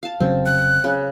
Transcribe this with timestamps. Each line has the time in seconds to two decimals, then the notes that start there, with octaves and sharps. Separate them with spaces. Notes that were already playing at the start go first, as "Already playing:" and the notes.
0.03 F5 A5
0.20 F1 C#3 F#3 C4
0.46 F#6
0.84 C#3